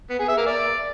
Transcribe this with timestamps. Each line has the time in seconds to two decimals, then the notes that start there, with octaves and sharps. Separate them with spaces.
0.10 B3
0.19 G#4
0.28 E5
0.37 A#3
0.47 D5